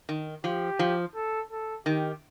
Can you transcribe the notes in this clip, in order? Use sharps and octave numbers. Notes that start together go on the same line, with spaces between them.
D#3
F3 G4
F3
A4
A4
D#3 G4